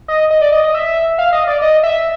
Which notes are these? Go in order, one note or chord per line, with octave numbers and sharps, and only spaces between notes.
D#5
D#5
D5
D#5
D#5
E5
F5
D#5
D5
D#5
E5